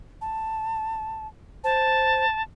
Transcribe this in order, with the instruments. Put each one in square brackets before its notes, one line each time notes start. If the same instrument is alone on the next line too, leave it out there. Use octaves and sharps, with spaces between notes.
[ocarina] A5
[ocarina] C5 [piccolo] A5